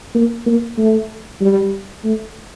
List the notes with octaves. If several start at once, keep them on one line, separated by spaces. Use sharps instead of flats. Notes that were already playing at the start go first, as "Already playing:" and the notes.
A#3
A#3
A3
G3
A3